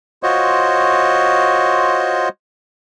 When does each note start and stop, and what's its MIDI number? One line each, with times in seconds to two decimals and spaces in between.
0.23 2.29 65
0.23 2.29 66
0.23 2.29 72
0.23 2.29 73
0.23 2.29 75